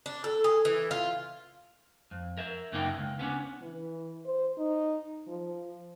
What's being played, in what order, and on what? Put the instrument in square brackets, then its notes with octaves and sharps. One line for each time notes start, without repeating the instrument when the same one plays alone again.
[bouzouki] D4
A4
G#4
E3
F4
[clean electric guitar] F2
A#4 E5
F#2 C#3 A#3 D#4 B4 G5
C#2
B3 C#4 D4
[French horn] E3
C5
D#4
F3